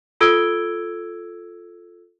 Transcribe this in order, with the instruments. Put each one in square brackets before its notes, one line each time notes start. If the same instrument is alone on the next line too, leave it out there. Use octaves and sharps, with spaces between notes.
[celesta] F4 A4 E6 G#6 D7 G7